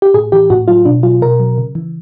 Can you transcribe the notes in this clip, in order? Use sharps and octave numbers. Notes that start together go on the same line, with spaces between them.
G4
A2 G#4
E3 G4
A2 F#4
F#3 F4
B2 D4
F#3 F4
B2 A#4
F#3
C#3
E3